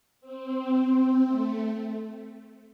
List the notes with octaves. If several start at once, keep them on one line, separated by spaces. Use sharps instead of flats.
C4
C4
A3